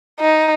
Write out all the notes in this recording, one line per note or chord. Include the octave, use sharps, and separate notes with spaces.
D#4